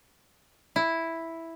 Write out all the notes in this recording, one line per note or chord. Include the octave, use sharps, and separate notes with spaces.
E4